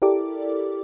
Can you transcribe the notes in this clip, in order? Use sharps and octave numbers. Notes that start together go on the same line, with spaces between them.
E4 G4 A4 A#4 D5 D6